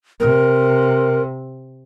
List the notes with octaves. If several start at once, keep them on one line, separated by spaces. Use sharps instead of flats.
C3 A#4